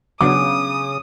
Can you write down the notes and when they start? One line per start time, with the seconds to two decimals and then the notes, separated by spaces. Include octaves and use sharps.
0.21 C#3 F#3 B3 D4 D6 D#6